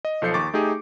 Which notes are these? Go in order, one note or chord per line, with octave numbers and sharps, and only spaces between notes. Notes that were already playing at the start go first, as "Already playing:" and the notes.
D#5
B1 F3 A4 G6 C7 C#7
D#2 C#6 D6 A6
A3 D#4 G4 G#4